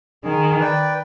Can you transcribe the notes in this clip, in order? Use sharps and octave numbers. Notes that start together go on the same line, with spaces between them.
D#3 G#4
B4 D5 G5